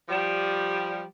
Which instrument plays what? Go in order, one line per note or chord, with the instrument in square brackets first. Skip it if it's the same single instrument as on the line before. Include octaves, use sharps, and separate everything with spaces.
[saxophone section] F3 G3